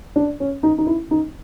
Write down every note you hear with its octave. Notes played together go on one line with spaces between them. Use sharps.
D4
C#4
D#4
D#4
E4
D#4